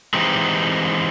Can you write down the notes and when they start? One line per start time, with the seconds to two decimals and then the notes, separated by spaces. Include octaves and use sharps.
0.14 E3 G#3 C4 D#4 G4